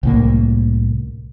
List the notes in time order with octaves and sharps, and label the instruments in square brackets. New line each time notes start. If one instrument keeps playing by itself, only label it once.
[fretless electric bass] C2 A2 A#3